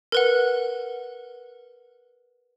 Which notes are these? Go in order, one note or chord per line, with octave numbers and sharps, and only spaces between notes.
A#4 B4 F#5